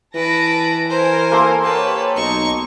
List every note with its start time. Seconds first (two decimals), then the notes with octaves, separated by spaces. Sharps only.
0.15 E3 B4 A5 A#6 D7
0.90 A#4 C5 G#5
1.32 A#3 A4 C6
1.63 G4 B4 C#5 A5
2.16 B1 D#4 C#6